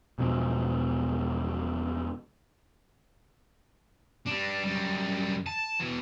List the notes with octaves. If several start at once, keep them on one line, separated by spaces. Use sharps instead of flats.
E1 B2 F3
G3 D4
F#2 G3
A5
B2 E3